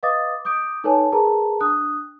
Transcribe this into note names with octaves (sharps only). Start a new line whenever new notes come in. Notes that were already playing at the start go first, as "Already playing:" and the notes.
B4 D#5 F5 D6 D#6 A6
D6 D#6 G6 D7
D#4 A4 B4 C#5 G#5 A5
G#4 A#4 B4 A5 A#5
D4 D#6 F#6